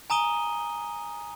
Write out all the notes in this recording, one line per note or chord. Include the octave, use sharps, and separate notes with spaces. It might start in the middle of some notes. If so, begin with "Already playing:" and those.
G#5 A#5 D#6 D#7 G7